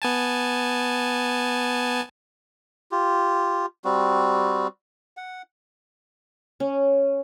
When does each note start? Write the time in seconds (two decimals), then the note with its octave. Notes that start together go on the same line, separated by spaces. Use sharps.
0.02 B3 G#5 A5
2.92 F4 G4
3.85 G3 C4 F#4
5.17 F#5
6.60 C#4